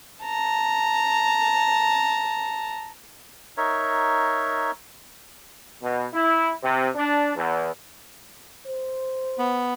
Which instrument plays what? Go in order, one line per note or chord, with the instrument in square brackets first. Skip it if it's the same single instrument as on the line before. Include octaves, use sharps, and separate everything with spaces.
[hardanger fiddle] A5 A#5
[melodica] D#4 A#4 C#5 E5
[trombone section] B2
E4
C3
D4
E2
[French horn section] C5
[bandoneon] B3